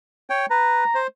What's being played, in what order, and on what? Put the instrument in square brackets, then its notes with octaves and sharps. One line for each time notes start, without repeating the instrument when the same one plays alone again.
[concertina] C#5 G5
[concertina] B4 [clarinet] A#5
[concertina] C5